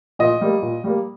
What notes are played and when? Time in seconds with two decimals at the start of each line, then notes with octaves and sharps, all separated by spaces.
0.19 A#2 D#5
0.41 G3 A#3
0.62 A#2
0.84 G3 A#3